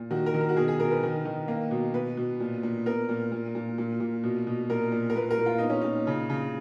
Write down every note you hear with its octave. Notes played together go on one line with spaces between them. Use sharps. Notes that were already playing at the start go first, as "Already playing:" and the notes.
Already playing: A#2
D#3 F#4
A#4
D#3
A#4
F#4
B2 G#4
G#4
B2 A#4
B4
D#3
D#3
A#3
B2
B2 B4
B2
A#2
A#2
B3 A#4
A#2
A#2
A#2
A#2
A#2
B2
B2
A#2 A#4
A#2
A#4
A#2 B4
A#4
A#2
F4
B3 D#4
C#4
A#2 D#4
C#3
C#3